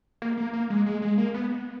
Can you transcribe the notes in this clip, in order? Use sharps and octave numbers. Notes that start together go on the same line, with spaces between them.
A#3
A#3
A#3
G#3
G#3
G#3
A#3
B3